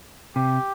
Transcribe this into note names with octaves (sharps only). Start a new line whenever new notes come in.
C3 G4